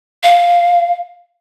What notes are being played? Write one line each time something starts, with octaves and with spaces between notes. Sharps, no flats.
F5